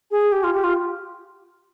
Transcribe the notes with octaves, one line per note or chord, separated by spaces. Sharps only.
G#4
G4
F4
G4
F4